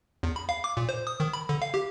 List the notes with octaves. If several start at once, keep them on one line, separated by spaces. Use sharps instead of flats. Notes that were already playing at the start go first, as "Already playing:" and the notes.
E2
B5
F5
D6
A#2
C5
D#6
D#3
B5
D3
F5
G4